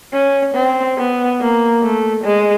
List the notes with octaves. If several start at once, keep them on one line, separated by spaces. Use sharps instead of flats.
C#4
C4
B3
A#3
A3
G#3